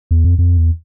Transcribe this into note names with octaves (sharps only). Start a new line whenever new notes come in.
E2
F2
F2
E2